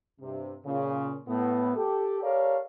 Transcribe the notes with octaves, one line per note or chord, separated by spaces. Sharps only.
G2 C3
A#2 C#3
A2 B3
G4 A4
G4 A4 A#4 C#5 D5 F5